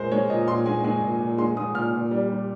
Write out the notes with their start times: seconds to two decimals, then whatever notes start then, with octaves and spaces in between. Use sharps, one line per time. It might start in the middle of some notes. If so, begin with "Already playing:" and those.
Already playing: A#2 G#3 A#4 C5
0.12 G#3 C#5
0.30 A#2 D#5
0.48 A#2 C6
0.66 G#3 G#5
0.84 G#3 G#5
1.02 A#2
1.21 A#2
1.38 G#3 C6
1.56 G#3 D#6
1.74 A#2 F6
1.93 A#2
2.11 G3
2.29 G3